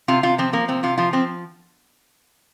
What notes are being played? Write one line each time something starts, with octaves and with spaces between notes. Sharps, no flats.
C3 F4
C3 F4
F3 C4
F3 A#3
C3 C4
C3 F4
F3 F4
F3 C4